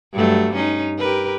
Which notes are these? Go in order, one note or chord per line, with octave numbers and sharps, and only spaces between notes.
G2 F#3 A3
C#4 D#4
G4 A#4 B4